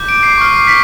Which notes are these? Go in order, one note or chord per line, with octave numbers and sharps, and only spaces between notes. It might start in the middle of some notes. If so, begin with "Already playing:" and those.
Already playing: D6 G6
D7
C7
C#6 F6
B6